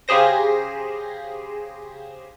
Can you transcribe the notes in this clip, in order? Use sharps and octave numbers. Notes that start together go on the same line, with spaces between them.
C#3 G4 G#4 C5 A#6